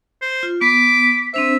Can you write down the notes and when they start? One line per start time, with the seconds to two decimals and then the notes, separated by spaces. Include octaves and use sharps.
0.22 C5
0.43 F4
0.61 B3 D6 B6
1.34 C4 D4 C5 E5